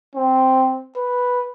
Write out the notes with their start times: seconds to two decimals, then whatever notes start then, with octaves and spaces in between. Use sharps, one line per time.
0.15 C4
0.97 B4